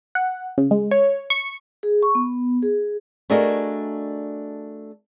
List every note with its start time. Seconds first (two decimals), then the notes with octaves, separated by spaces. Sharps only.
0.15 F#5
0.58 C#3
0.71 G#3
0.91 C#5
1.30 C#6
1.83 G#4
2.03 C#6
2.15 B3
2.63 G#4
3.30 A3 D4 F#4 G#4 A#4 D#5